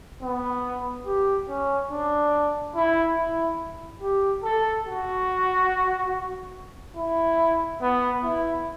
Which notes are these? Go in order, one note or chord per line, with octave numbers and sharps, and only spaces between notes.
B3
G4
C#4
D4
E4
E4
G4
A4
F#4
E4
B3
E4